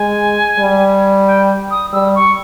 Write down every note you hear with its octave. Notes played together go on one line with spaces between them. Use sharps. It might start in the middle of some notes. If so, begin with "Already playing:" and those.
Already playing: G#3 G#5
G3
G5
D#6
G3 E6
C#6